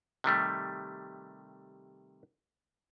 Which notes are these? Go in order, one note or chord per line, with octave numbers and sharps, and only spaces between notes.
C3 D#3 G3 A3